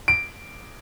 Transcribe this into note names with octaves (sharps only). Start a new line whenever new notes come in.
D7